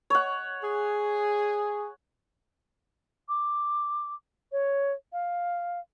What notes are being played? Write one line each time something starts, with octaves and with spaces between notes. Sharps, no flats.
C#5 F#5
G#4
D6
C#5
F5